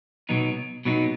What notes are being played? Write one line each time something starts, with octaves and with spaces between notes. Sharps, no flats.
B2 F#3 B3 D#4
B2 F#3 B3 D#4